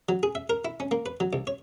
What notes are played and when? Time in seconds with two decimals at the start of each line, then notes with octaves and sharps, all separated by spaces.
0.09 F#3
0.23 G#4
0.35 E5
0.50 A#4
0.65 E4
0.80 C#4
0.91 A#3
1.06 B4
1.20 F#3
1.33 C2
1.47 C#5